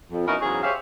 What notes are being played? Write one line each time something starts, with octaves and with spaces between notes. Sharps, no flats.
F2
B3 C#4 D#4 E4 F#4 A#4
E2 G#2 C#3 F#3 C#4 G#4
G4 G#4 C5 C#5 E5 F5